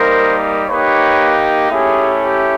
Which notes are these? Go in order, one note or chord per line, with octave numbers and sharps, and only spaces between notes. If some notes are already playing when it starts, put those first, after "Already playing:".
Already playing: G3 A#3 D#4 A#4 C5
A#3 D#4 G4 B4 C#5
A3 C#4 E4 G4 G#4
G4